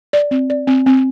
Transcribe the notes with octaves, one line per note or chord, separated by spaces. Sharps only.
D5
C4
D5
C4
C4